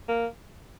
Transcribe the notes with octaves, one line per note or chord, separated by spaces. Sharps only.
A#3